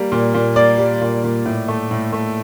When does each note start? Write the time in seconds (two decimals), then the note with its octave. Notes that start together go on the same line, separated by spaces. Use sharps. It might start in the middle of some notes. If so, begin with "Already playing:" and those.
Already playing: G3 A#3
0.12 A#2
0.34 A#2
0.56 A#3 D5
0.78 G3
1.01 A#2
1.24 A#2
1.46 A2
1.68 A3
1.91 A2
2.13 A3